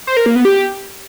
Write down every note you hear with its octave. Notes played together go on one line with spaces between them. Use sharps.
C5
A#4
A#3
B3
G4